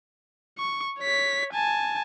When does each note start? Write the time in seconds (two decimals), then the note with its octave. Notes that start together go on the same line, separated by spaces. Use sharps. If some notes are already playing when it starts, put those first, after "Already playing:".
0.58 C#6
0.99 C#5 B6
1.53 G#5 A5